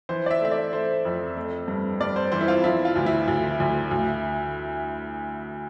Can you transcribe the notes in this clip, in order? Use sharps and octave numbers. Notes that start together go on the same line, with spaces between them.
E3 C5
D5
E5
A3 E5
D5
A3 C5
F2
A3
G2
G2 D5
C5
E3 C5
E4
F4
F3 E4
F4
D2
E4
D2
D2
D2